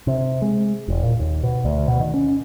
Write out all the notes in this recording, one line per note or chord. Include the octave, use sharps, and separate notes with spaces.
C3
G#3
E1
A#2
D#2
B2
D2
B2
D#3
C#4